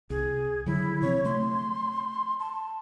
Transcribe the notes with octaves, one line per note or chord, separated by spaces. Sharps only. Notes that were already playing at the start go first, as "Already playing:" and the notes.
C2 G#4
D3 F#3 E4
C3 F3 C4 C#5
A3 C6
A5